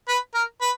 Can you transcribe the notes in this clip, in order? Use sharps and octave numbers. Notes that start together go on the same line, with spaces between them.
B4
A#4
B4